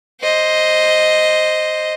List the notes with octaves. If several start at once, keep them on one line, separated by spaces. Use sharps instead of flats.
C5 D#5